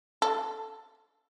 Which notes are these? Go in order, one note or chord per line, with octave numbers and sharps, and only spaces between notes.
A4